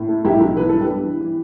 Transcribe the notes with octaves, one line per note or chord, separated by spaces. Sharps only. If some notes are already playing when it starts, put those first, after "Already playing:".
Already playing: A2
A3
B1 E4 G4
B1
E3 B4
G2 A4
G4 B4
G2
E3
E3